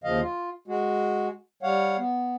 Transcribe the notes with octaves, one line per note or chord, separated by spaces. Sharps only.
D#2 C#3 F3 D#5 F5
F4
G#3 F#4
G3 C#5 F5 F#5
B3